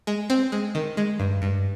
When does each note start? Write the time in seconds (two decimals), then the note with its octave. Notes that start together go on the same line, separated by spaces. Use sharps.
0.07 G#3
0.30 C4
0.52 G#3
0.75 D#3
0.97 G#3
1.20 G2
1.42 G2